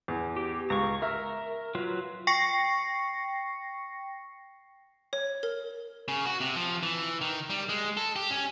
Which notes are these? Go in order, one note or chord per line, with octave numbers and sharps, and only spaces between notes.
E2
G4
C#2 A#5 C#6
A#4 E5 F6
F#3 F4 B4
G5 C#6 A#6 C7 C#7
C#5
A#4
C#3
F#4
C3
F3
E3
D#3
G3
G#3
A4
G4
C#4